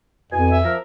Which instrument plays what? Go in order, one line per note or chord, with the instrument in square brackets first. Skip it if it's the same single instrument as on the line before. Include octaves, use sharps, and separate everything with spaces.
[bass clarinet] F2 [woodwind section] B2 E4 G#5
[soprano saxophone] E5
[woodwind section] F3 A#4